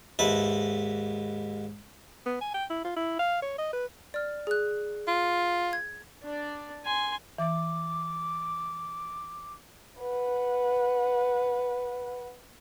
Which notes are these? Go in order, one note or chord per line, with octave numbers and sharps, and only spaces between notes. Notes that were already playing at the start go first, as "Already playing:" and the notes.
D#2 G#2 B4 E5 A5
B3
G#5
G5
E4
F4
E4
F5
C#5
D#5
B4
D5 F6
G#4 F#6
F4
G#6
D4 D5
G#5 C6
E3 D6
B4 F#5